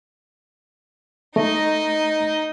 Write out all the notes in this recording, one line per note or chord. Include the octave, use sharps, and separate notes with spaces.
A3 D#4 D#5